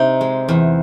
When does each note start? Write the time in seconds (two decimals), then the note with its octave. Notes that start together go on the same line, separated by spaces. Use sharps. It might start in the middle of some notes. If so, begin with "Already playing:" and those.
Already playing: C3 D#4
0.21 G#3
0.49 E2